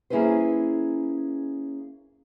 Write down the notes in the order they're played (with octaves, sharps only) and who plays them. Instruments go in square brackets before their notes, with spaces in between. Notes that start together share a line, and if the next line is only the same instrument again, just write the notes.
[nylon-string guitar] A#3 C#4 E4 G#4 B4 C5